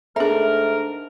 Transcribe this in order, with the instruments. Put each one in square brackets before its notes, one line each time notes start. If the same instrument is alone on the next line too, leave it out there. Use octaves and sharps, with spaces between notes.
[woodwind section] G#2 A#4 [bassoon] A3 [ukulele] D4 A#5 [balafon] G#4 E5